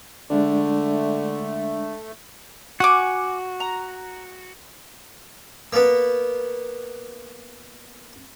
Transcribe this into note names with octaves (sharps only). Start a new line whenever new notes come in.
D3 G#3 A3 D4 D5
F#4 F#5 G#5 D6
A#5
A#3 B3